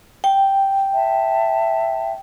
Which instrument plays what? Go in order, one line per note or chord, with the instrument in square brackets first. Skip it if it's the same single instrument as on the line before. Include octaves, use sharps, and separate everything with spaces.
[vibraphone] G5
[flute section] E5 A5